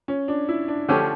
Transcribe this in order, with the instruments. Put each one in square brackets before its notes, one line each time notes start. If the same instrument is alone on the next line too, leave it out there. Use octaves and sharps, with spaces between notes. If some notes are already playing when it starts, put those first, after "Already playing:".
[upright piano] C#4
D4
E4
D4
[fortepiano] D3 F3 A3 C#4 G4